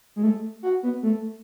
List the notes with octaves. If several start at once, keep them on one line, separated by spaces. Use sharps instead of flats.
G#3
A3
F#4
B3
A3